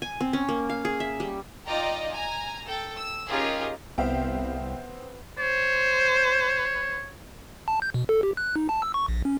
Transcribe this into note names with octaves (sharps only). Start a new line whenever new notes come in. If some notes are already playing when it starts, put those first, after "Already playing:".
G#5
C4
C#4
A#3
F5
G#4
E5
G3
D#4 F4 D5 D#5 G5 A#5
G#5 A#5
A4 G5
E6
C#4 D#4 F4 G4 G#4 A#4
C2 B3 C4 C5 E5 F5 G5
C5 C#5
A5
G6
B2
A4
G4
F#6
D#4
A5
E6
C#6
A#1
C#4